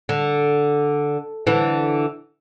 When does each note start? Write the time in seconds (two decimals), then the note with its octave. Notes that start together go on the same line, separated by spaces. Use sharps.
0.09 D3
1.47 D3 E3